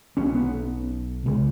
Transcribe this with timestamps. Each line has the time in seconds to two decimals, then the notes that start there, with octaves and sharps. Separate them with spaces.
0.17 B1 B2 C#4
0.35 B3
1.26 C#2 C#3